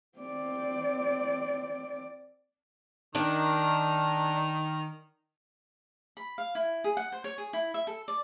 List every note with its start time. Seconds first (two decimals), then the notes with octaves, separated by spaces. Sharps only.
0.18 C4 D5
3.15 D#3 D4
6.17 B5
6.38 F5
6.55 E4
6.84 G#4
6.97 F#5
7.12 C5
7.24 C#5
7.38 G#4
7.53 E4
7.74 E5
7.87 A4
8.08 D5